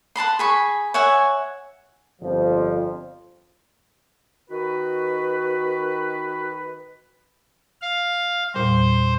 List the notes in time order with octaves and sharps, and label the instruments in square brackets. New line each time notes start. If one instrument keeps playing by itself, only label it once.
[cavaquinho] F#5 A5 B5 C6
G#4 B5 C#6
C#5 E5 F#5 G#5
[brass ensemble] G1 F2 F3
[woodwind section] D#3 B4 [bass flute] F#4
[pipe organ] F5
[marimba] E2 A#2 G3 [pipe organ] C5